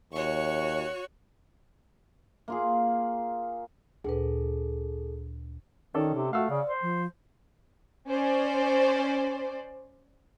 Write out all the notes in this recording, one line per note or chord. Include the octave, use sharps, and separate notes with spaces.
D#2 F#4 C#5 C#6
A#3 F4 G#4
D2 A#2 G#4 A4 B4
D#3 C#4 D#4 A4 D5
C3
A3 F#4 F5 F#5 E6
C#3 D5
C5
F3
C#4 C5 D5